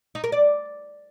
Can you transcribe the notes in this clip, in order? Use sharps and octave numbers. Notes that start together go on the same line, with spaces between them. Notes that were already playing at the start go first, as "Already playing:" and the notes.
D#4
A#4
D5